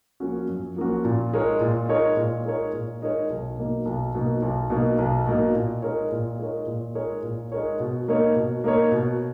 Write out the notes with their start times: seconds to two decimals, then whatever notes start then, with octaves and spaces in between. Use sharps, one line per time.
0.20 F3 A#3 C#4 F#4
0.48 F#2
0.76 F3 A#3 C#4 F#4
1.05 A#2
1.33 G#3 D#4 A#4 C#5
1.61 A#2
1.89 G#3 D#4 A#4 C#5
2.17 A#2
2.45 G#3 D#4 A#4 C#5
2.73 A#2
3.02 G#3 D#4 A#4 C#5
3.30 B1
3.58 B2 A#3 D#4
3.85 B1
4.15 B2 A#3 D#4
4.42 B1
4.70 B2 A#3 D#4
4.98 B1
5.26 B2 A#3 D#4
5.54 A#2
5.82 G#3 D#4 A#4 C#5
6.12 A#2
6.38 G#3 D#4 A#4 C#5
6.67 A#2
6.95 G#3 D#4 A#4 C#5
7.23 A#2
7.52 G#3 D#4 A#4 C#5
7.80 B2
8.08 A#3 D#4 A#4 C#5
8.36 B2
8.64 A#3 D#4 A#4 C#5
8.92 B2